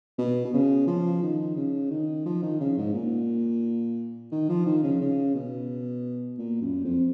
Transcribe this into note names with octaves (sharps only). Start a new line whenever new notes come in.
B2
B2
C#3
F3
D#3
C#3
D#3
F3
D#3
C#3
G#2
A#2
D#3
F3
D#3
C#3
C#3
B2
A#2
F#2
F2